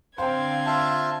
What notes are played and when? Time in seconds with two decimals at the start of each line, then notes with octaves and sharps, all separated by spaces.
0.18 D3 C4 C5 F5 G5 G#6
0.66 F4 E5 A5